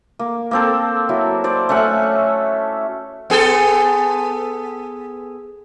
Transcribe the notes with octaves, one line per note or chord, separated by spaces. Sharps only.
A#3
A#3 C4 A4
F#3 E4
C5 D5
A3 C#4 E5 F#5
B3 G#4 A4